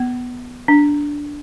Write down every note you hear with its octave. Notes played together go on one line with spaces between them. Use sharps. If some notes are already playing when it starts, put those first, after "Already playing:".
Already playing: B3
D4